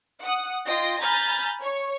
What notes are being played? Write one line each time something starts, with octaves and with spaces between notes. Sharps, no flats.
F#5 D#6
F4 D#5 G5 A#6
G#5 A#5 B5 F6 G6 A6
C#5 C#6